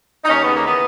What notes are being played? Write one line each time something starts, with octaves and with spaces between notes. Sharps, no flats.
D#4
D#2 C#4
C#3 B3
A#3
E3 B3